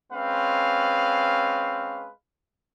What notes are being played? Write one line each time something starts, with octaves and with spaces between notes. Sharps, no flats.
G#3 C4 C#4 B4 F5